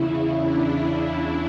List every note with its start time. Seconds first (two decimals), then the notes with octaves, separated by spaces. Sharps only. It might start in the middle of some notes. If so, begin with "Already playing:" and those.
Already playing: E2 C#3 E3 E4
0.46 D4